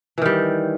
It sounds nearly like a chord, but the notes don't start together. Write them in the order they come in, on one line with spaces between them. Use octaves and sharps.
E3 D#3 G3